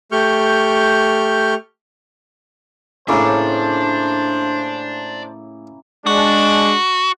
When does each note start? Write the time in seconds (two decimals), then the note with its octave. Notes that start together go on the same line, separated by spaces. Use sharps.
0.12 A3 G4 C#6 F6 G6
3.08 A2 C#3 A#3 C#4 D4 E4 C5 A5
6.06 G#3 D4 F#4